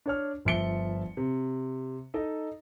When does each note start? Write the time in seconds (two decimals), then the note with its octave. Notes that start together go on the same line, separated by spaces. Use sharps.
0.06 D4 C#5 F6
0.45 G1 F3 E5 C#7 G7
1.17 C3
2.14 D#4 A4 D#5